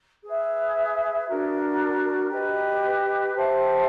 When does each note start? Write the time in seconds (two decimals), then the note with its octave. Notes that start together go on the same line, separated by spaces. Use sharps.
0.23 G#4 B4 E5
1.26 D4 F#4 A#4
2.30 G4 B4 D#5
3.33 G4 C5 E5 A5